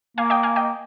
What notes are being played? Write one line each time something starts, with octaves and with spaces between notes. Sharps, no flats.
A#3 F5 G#5
D#5 G5
F5 G#5
D#5 G5